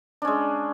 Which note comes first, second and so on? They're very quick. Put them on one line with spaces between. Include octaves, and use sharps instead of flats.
D4 C#4 G#3